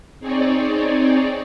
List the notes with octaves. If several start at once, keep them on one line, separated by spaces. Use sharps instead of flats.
C4 D#4 G#4 C#5 D5